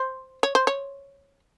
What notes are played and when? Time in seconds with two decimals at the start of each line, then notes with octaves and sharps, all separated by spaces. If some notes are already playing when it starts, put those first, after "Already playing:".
Already playing: C5
0.43 C#5
0.55 C5
0.67 C#5